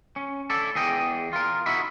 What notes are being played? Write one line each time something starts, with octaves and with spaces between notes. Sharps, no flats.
C#4
E4 A4 D5
E2 G#4 D#5 G5
F4 A#4
D#4 F#4 E5 B5